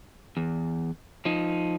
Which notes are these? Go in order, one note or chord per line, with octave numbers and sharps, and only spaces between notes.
E2
F3 D#4